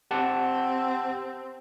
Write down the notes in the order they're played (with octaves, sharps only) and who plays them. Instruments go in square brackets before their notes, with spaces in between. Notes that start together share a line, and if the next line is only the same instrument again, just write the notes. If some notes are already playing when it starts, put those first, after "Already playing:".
[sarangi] C4 [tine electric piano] G4 F#5 A5